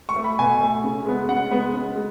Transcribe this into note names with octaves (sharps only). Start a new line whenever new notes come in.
C#6
A3
B5
B2 G#5
A3
C#3
G#3 B3
C#3 F#5
G#3 B3
C#3
G#3